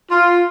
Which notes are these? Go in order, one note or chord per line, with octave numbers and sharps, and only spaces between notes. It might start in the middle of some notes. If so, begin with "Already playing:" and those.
F4